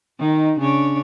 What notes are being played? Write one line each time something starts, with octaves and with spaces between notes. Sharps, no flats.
D#3 D#4
C#3 D4 C#5